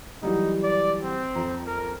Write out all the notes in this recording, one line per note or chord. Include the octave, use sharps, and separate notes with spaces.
E3 F#3 G3 D#4
D5
C4
F2 A#5
A#4